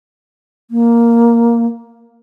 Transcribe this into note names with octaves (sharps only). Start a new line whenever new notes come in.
A#3